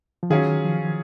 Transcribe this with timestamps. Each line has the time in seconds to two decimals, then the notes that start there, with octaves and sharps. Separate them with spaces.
0.23 F3
0.30 D#3 F#3 C#4 F4 G#4
0.64 F3